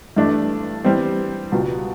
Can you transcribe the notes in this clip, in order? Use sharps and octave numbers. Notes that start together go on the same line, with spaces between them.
G2 E3 A3 D4
E3 G3 C4
C#2 B2 G3 B3